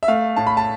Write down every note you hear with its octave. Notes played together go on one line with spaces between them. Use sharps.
E5
A3 F5
A2 A5
B5
A5